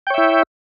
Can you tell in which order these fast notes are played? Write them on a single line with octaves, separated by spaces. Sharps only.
G5 C#5 E5 E4